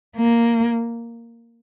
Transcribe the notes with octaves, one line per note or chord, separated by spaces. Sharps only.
A#3